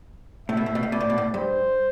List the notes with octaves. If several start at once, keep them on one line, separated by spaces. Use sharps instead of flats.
A2 E5
B2
A2
B2
A2
B2 D5
A2
B2
A2
G2 C5